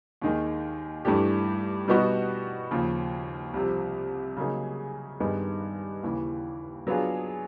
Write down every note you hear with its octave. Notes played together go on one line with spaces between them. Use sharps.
D#2 D#3 G#3
G2 E3 A3 D4 G4
B2 G3 B3 D#4 F#4
D#2 C#3 F3
C2 C3 F3
C#3 F#3 A#3 D#4 G#4
G2 D#3 G#3 B3 D#4
D#2 C#3 E3
F#3 B3 D4 F4 G#4